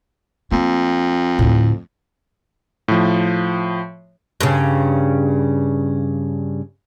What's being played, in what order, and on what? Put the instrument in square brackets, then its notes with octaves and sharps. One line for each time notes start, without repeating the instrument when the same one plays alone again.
[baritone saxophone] F2 [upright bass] A#3
[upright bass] D2 A2
[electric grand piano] A2 F3
[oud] G2 C#3